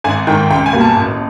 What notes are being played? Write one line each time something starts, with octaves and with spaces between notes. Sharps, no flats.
G#1 G#5
G#2 D#3 G5
C#2 G5
G#5
B2 G3 A#3
A5
A1